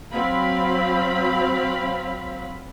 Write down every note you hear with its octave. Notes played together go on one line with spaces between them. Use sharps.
F#3 C4 F5 B5